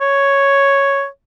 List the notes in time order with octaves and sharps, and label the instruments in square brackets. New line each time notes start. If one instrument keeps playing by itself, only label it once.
[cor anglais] C#5